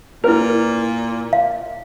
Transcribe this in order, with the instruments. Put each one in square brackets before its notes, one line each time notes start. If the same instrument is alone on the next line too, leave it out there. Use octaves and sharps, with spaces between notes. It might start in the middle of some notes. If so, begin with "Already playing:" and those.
[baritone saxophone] A#2 [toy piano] E4 B4 [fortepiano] A#4
[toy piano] F5